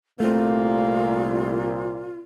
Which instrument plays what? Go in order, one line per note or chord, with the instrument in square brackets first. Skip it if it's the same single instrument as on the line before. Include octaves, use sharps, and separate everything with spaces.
[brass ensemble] C2 A#2 [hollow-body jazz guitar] A3 C4 [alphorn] A#3 [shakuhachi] F4